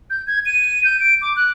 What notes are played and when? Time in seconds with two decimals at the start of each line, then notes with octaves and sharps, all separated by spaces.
0.10 G6
0.27 G#6
0.46 D#7
0.85 G6
1.00 D7
1.22 D6
1.36 F#6